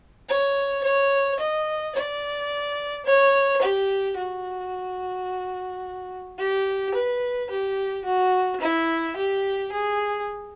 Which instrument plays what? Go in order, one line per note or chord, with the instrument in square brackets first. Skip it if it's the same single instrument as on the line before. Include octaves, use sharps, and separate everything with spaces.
[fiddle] C#5
C#5
D#5
D5
C#5
G4
F#4
G4
B4
G4
F#4
E4
G4
G#4